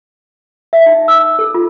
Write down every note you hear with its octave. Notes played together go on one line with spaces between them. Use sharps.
E5
D#4
E6
A4
F4